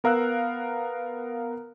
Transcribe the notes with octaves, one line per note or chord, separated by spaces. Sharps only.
B3 A#4 F5 E6 F#6